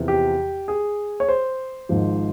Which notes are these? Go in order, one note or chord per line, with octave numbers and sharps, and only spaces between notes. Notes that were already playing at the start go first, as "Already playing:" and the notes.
Already playing: E2 C3 F3
G4
G#4
C#5
C5
G#1 G#2 F3